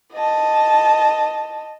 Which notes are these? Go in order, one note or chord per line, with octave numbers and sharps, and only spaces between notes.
D#5 A5